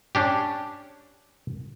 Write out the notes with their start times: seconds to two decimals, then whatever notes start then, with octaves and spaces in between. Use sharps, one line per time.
0.15 C#4 D4 G4